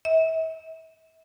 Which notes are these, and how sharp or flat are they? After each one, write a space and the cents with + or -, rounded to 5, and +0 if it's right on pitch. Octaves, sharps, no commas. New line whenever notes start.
E5 -35